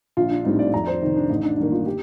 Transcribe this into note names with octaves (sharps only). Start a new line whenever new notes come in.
A#1 F4
D4
A2 G3 C4 D#4
D5
F2 A#5
D5
C5
C3 D#3 D#4
D4
A1 D#4
D4
G2 D#3 A#3 D#4
F4
G4